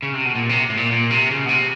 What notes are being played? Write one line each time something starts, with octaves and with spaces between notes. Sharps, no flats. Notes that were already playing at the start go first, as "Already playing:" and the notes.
C#3
C3
B2
A#2
C3
A2
A#2
A#2
C3
C#3
B2
C3